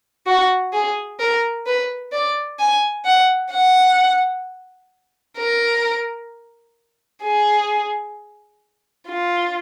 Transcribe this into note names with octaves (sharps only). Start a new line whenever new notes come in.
F#4
G#4
A#4
B4
D5
G#5
F#5
F#5
A#4
G#4
F4